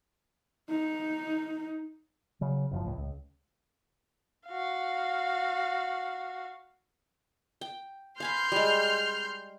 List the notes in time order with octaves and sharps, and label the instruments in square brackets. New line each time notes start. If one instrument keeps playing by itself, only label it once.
[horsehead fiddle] D#4
[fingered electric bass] C#3 F#3
F#1 F#2 F3
C#2 A2
C#2
[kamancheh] F#4 F5
[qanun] G5
[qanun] F5 G#5 B5 [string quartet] C6 F6 G6
[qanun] G3 G#3